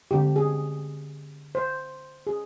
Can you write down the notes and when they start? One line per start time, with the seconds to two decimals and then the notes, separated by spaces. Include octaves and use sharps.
0.11 D3 G#3 C4 G4
0.36 G#4
1.55 C5
2.27 G#4